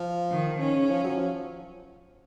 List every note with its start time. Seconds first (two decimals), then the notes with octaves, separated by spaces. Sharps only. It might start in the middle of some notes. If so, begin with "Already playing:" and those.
Already playing: F3
0.31 D#3
0.60 D#3 C#4
0.75 C#3
0.90 F3
1.04 F#3
1.18 F3